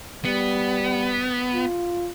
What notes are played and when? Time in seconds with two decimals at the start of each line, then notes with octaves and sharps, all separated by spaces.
0.25 G3 B3
1.54 F4